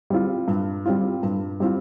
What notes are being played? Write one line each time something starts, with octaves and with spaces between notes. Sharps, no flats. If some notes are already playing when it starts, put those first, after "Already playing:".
G3 C4 F4
G2
G3 C4 F4
G2
G3 C4 F4